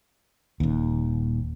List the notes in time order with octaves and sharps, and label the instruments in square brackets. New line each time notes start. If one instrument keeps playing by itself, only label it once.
[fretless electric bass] D#1 D#2